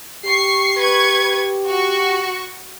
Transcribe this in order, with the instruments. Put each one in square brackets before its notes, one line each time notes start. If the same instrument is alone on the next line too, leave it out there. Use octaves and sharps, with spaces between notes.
[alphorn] G4 [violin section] C#6 C7
[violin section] B4 C#6 G#6
F#4 C#6